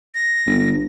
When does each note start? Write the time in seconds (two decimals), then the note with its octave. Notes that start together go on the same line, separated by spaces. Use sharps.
0.15 A#6
0.46 G1